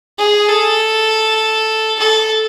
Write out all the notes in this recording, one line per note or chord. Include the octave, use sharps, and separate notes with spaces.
G#4
A4
A4